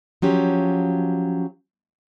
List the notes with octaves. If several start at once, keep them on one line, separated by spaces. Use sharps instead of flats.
F3 F#3 C#4 G4